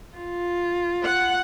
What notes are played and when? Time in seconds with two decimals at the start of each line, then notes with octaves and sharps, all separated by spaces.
0.16 F4
1.03 F#5